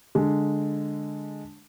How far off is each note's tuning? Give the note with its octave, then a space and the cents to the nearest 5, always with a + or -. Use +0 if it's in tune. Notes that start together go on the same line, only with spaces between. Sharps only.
D3 +0 G#3 +0